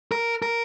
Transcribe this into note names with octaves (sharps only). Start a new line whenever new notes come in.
A#4
A#4